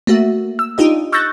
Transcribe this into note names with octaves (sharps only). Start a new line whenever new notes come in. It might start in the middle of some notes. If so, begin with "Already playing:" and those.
A3 A#3 F#4 E5
E6
D4 D#4 F4 G4 D#5
C#6 E6 F#6 G6 A6 A#6